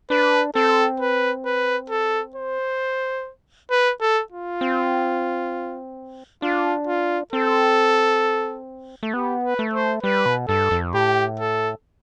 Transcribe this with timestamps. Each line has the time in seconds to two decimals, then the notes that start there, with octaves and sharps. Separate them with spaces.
0.10 D4 B4
0.55 C4 A4
1.00 B4
1.45 B4
1.90 A4
2.36 C5
3.71 B4
4.01 A4
4.32 F4
4.61 C4
6.42 D4 F4
6.87 F4
7.33 C4 A4
9.03 A3
9.14 B3 G4
9.44 B4
9.59 A3
9.74 C5
10.03 G3 B4
10.26 B2
10.48 G2 A4
10.71 F2
10.94 A2 G4
11.40 A4